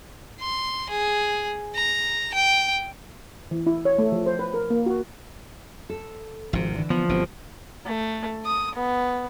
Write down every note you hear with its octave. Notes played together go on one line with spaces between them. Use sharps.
C6
G#4
A#5
G5
E3
E4
C#5
A3
F3
C5
B4
A#4
A#3
F#4
A4
G#1 C3 F3
D3 E3
F3 B3
G1 B2 B3 C4
A3
D#6
B3